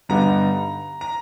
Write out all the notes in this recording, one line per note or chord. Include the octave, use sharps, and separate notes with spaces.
G2 D3 G3 B3 D#4 A#5
A#5